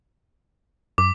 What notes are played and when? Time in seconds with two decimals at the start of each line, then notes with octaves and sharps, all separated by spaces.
0.98 F#2 D6